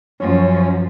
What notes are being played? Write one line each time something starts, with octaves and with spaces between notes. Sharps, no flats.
F#2 F3 C#4